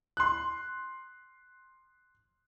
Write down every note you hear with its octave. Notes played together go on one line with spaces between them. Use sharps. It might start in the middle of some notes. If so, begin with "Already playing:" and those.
C6 F#6